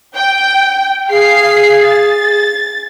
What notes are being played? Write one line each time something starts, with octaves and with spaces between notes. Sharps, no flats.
G5
G#4 F5 C7
A6